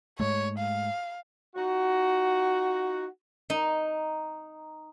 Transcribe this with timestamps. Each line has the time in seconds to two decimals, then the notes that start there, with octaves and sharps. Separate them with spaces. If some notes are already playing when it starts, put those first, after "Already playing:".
0.20 G#2 G#3 A3 C#5
0.59 F5
1.56 D#4 F4 F#4
3.50 D#4